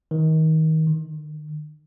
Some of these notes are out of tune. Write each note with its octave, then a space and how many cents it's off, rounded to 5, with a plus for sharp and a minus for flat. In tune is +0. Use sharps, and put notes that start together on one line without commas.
D#3 +25
D#3 -45